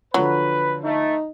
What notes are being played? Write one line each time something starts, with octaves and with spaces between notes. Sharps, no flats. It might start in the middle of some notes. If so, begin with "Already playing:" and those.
D3 F3 F#3 B4
A3 D#4